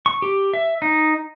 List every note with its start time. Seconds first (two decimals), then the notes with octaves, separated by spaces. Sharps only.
0.06 C#6
0.22 G4
0.54 E5
0.82 D#4